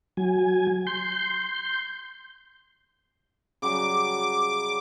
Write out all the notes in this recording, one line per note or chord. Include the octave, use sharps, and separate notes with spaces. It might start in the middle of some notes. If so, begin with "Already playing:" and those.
F#3 G#5
C6 G6
C#3 F#3 G3 D6